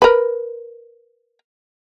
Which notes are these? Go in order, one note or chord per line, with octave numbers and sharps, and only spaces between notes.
A#4 B4